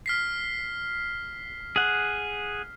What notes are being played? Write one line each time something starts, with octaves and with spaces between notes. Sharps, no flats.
F6 B6 C7
G#4 F#5